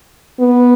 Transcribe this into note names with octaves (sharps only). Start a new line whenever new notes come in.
B3